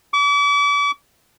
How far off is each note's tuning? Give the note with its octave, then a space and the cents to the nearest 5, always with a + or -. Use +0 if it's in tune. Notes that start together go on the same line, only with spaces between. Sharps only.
D6 -40